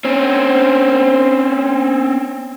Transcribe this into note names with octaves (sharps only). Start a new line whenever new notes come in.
C4 C#4